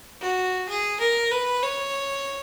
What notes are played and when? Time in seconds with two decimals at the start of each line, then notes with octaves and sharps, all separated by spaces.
0.21 F#4
0.69 G#4
1.00 A#4
1.31 B4
1.63 C#5